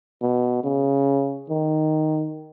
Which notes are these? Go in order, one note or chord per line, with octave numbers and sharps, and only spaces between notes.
B2
C#3
D#3